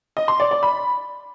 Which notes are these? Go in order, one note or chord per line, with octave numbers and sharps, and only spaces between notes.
D#5
C6
D5
D5
B5